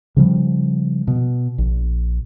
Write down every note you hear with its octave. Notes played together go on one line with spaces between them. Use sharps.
C#3 F3 G3
B2
A#1